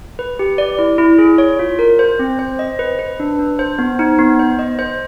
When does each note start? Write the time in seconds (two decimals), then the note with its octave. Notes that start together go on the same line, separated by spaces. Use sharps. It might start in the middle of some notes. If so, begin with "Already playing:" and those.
0.19 B4
0.39 G4
0.58 D5
0.78 E4
0.98 E4
1.18 G#4
1.38 C#5
1.59 F4
1.79 A#4
1.99 C5
2.19 C4
2.39 C5
2.59 D#5
2.79 B4
2.99 B4
3.20 D4
3.39 D4
3.59 C5
3.79 B3
3.99 D#4
4.19 B3
4.39 C5
4.59 D#5
4.79 C5